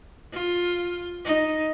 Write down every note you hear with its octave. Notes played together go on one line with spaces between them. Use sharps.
F4
D#4